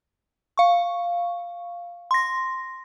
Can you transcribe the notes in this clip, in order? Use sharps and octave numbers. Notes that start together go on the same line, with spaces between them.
F5 C#6
C6 A#6